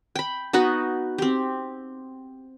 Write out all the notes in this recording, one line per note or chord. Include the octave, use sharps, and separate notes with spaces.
G5 B5
B3 D#4 F#4 B4
C4 G4